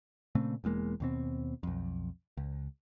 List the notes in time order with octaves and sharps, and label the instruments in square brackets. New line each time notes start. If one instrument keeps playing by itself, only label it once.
[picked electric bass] A#2 C#3 A3 C4
E1 E2 G#3 A#3
D#2 B2 C4
B1 F2
C#2